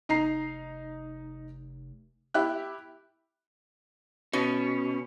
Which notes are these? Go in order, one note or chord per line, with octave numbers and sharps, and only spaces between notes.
F1 D#4 A#5 C7
E4 G4 F#6
B2 C#4